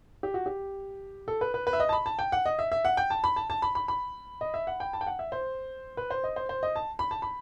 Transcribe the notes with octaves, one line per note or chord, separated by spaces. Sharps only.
G4
F#4
G4
A4
B4
B4
B4
E5
D#5
A5
B5
A5
G5
F#5
D#5
E5
E5
F#5
G5
A5
B5
A5
A5
B5
B5
B5
D#5
E5
F#5
G5
A5
G5
F#5
E5
C5
B4
C5
D#5
C5
C5
D#5
A5
B5
A5
B5